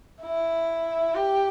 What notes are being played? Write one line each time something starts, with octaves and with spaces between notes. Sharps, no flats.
E4
G4